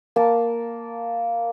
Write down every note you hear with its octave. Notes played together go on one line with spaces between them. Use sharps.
A#3 A5